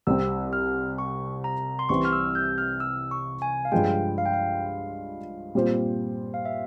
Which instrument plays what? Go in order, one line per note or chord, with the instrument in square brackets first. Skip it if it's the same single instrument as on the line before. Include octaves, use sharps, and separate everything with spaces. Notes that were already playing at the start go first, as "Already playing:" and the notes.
[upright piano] C2 C3 G3 C4 [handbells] E6
[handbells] F6
C#6
A#5
C6
[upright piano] C2 C3 E3 G3 C4 [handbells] C#6
[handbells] F6
E6
G6
F6
E6
C#6
G#5
F5
[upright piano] G2 F3 G#3 [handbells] G5
[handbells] F5
G5
F5
[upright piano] A#2 G3 C4 F4 C5
[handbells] F5
E5